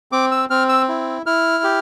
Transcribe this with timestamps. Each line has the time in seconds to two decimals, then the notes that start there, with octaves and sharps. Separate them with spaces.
0.12 C4 D6
0.31 E6
0.50 C4 F6
0.69 E6
0.89 E4
1.26 E4 F6
1.64 G4